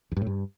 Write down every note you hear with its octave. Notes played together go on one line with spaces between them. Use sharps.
E2
G2
A2
G2